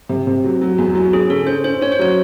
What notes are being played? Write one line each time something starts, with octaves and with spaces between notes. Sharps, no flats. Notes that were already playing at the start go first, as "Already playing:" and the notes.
C3
C3
F#3
F#3
E2
F#3
C#4 G#4
C#3 A4
C#4 C5
C#4 C5
C#4 C#5
C5
F#3 C#5